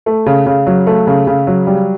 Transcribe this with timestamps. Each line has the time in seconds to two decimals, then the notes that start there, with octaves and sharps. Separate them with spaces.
0.06 A3
0.26 C#3
0.46 C#3
0.66 F#3
0.87 A3
1.07 C#3
1.27 C#3
1.47 F#3
1.67 G3